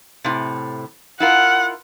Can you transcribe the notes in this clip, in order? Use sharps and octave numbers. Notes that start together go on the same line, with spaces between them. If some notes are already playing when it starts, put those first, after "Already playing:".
A2 C3
E4 F4 A#4 F#5